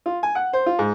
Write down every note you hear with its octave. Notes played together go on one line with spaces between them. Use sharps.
F4
G#5
F#5
C5
F4
G#2